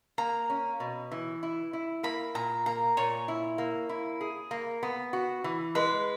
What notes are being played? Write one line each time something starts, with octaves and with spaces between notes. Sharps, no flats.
A#3 A#5
C#4
B2
E3
E4
E4
A#3 B5
A#2 A#5
A#3 A#5
A#2 C#5
E4
A#3
E4
G#4
A#3
B3
F#4
E3
G#3 B4